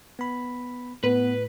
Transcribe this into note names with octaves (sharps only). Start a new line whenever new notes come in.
B3 B5
A2 B3 B4